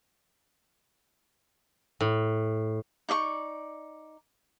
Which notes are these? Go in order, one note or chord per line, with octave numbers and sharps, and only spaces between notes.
A2
D#4 D5 E5 C#6